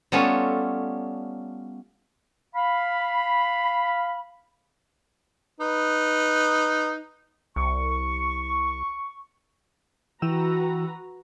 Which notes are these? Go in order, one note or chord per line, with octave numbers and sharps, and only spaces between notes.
G3 A3 B3 C#4 F4 A4
F5 B5
D#4 B4
C2 C#6
E3 F#4 B4 G5 A#5 E6